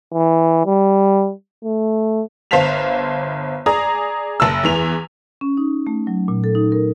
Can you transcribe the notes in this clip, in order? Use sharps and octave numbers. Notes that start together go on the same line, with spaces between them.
E3
G3
A3
G1 C5 F5 A5 B6 F7
G#4 D5 A#5 D#6
F#1 A5 E6
E2 E3 F7
C#4
D#4
A3
F#3
A#2
A4
D#4
A#4